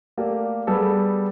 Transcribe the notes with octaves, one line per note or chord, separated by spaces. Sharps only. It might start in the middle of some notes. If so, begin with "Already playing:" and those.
A3 A#3 G4 D5
G3 B3 G#4 A4